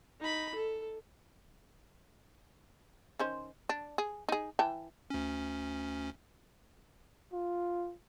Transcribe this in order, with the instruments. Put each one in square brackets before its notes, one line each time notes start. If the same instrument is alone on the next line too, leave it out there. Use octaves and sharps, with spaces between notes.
[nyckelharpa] D#4 B5
A4
[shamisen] D#3 C#4 C5
D4
G#4
D#4 G#4
E3 G5 A5
[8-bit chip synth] D2 C#4
[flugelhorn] F4